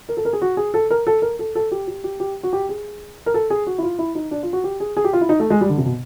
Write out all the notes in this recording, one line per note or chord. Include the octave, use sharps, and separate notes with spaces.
A#4
A4
A#4
G#4
F#4
G#4
A4
A#4
A4
A#4
A4
A4
G4
G4
G4
G4
F#4
G4
G#4
A#4
A4
G#4
F#4
E4
F4
E4
D#4
D4
F4
F#4
G4
G#4
G#4
G4
F4
E4
D#4
A3
G#3
G3
D3
C3
B2